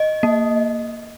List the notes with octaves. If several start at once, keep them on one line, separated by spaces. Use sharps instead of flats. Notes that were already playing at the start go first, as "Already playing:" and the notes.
Already playing: D#5
A#3